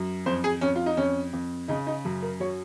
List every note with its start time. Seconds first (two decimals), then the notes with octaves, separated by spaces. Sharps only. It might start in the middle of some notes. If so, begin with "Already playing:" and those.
Already playing: F#2
0.26 F2 C5
0.44 G#4
0.61 F2 C#4
0.76 F4
0.86 D#4
0.97 F2 C#4
1.33 F2
1.68 C#3 D#4
1.87 D#4
2.05 F#2
2.22 A#4
2.40 F#3 C#5